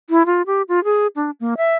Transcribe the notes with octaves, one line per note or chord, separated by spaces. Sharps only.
E4
F4
G4
F4
G#4
D4
A#3
E5